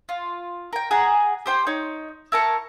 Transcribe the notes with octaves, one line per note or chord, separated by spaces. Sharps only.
F4
A#4 G5
G#4 F#5 A#5
G4 C5 G5
D#4 C#5
E4 A#4 A5 C#6